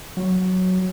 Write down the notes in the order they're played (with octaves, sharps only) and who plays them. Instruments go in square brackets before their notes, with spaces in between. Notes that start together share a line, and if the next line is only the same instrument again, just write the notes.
[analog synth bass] F#3